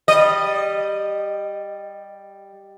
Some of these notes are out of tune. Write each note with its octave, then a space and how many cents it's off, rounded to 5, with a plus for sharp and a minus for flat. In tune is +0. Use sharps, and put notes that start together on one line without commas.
G3 +0 D#5 -20